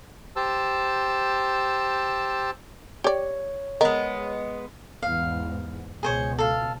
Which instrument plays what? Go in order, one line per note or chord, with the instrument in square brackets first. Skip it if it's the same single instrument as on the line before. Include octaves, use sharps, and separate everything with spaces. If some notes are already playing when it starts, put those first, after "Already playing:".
[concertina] G4 C5 A5 E6
[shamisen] G4 D5 [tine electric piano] C#5
[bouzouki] G#3 B3 [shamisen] A#4 [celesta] D#5
[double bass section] E2 G#2 [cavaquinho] F5
[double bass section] C#2 B2 [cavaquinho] G#4 C5 C#5
[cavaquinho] A4 F5